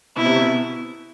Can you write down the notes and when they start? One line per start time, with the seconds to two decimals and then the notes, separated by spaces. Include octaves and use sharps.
0.16 B2 E4
0.26 C3
0.36 B2